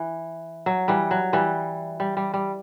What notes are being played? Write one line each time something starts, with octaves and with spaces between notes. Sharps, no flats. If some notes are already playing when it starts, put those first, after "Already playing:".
Already playing: E3
F#3
E3 G3
F#3
E3 G3
G3
G3
G3